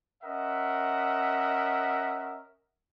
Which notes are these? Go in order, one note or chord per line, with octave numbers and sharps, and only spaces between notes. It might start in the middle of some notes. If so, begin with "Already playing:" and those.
C#4 A#4 D#5 E5 F#5